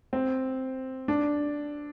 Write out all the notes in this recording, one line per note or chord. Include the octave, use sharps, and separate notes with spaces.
C4
D4